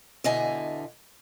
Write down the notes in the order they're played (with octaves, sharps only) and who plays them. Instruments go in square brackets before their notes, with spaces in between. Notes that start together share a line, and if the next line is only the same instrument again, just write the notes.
[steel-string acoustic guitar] E2 B2 D3 D#5 E5 G#5